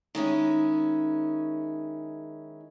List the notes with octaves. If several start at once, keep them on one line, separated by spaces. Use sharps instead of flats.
D#3 G#3 C#4 E4